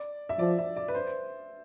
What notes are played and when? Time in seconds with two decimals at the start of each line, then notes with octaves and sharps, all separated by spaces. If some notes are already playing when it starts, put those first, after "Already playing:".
Already playing: D5
0.29 E5
0.39 F3 D5
0.58 E5
0.76 D5
0.88 B4
0.95 C5